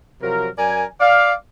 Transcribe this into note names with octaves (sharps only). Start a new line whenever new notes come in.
C3 F3 F#3 A#4
F#2 A#4 D5 G#5
D5 F5